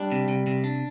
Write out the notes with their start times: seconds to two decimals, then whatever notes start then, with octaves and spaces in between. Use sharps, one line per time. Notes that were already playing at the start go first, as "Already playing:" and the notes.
Already playing: G3 D4
0.12 C3
0.28 C3
0.47 C3
0.64 D4